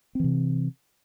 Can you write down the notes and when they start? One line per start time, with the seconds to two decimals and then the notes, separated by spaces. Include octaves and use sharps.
0.15 C4
0.20 E3
0.24 C3